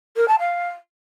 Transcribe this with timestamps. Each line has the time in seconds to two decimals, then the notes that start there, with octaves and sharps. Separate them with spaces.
0.16 A#4
0.28 A5
0.39 F5